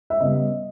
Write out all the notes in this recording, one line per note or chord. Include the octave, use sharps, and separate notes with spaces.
E5
C#3 G3 B3 D#5